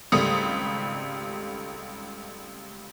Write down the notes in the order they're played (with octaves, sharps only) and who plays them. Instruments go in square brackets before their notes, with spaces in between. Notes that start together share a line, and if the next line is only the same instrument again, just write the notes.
[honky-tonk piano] G#1 C#2 G3 A3 D#6 C#7